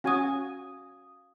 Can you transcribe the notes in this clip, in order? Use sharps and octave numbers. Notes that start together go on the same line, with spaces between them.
C#4 F#4 F5 G#5 D#6